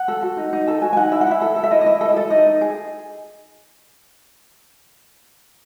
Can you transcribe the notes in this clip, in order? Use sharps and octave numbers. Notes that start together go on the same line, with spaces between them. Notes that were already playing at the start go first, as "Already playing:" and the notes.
Already playing: F#5
A4
F#4
D#4
D#4
A4 A5
F#4 G#5
G#5
D#4 F#5
E4 E5
F#5
E4 E5
A4
A4
E5
E4 D#5
D#5
E4 E5
A4
D#5
A4 E5
D#4 D#5
D#4
G#4